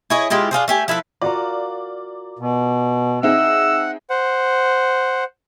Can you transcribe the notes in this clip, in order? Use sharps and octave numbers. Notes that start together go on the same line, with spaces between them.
E4 G#4 C#5 D#5
G#3 E4 F4 G4
D4 F4 G#4 C5
A3 G4 G#5
F3 E4 A4 B4
F4 F#4 A#4 D5
B2
C4 D#4 G#4 E5 F#5 E6
C5 F#5